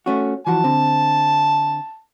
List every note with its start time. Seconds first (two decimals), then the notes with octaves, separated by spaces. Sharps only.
0.06 A3 C#4 F#4
0.47 E3 F3 F#4 A5
0.64 D3 C4